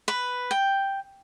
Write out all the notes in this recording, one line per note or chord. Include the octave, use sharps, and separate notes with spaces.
B4
G5